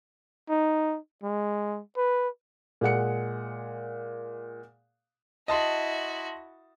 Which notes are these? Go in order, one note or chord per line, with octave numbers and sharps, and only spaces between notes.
D#4
G#3
B4
A#2 G#3 F#5 C#7
E4 F#4 D#5 A5 C6